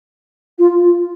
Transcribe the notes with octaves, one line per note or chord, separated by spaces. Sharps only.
F4